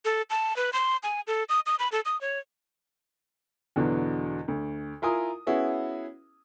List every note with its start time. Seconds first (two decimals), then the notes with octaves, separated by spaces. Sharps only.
0.05 A4
0.30 A5
0.56 B4
0.73 C6
1.03 G#5
1.27 A4
1.49 D#6
1.66 D#6
1.79 B5
1.92 A4
2.06 D#6
2.21 C#5
3.76 E2 B2 D3 F#3
4.48 D2
5.02 E4 F4 A#4 G#5 D#6
5.47 B3 C#4 E4 F#4 G#4